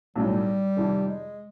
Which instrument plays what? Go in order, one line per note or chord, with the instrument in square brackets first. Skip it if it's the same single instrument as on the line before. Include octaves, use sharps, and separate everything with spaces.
[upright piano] B1 A2 F#3 A3 [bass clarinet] G3
[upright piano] F2 C3 D#3
[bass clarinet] G#3